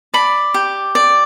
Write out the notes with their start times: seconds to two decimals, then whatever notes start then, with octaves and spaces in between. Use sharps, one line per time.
0.14 D5 B5
0.54 G4
0.95 D5